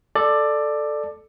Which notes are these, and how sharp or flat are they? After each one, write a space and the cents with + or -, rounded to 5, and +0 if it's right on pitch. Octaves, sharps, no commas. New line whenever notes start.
A4 +0 D5 +15